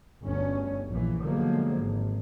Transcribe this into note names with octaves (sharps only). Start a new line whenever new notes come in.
G1 D2 C#4
A#1 E3
B2 D3 F3 F#3 G#3 A#3
G#1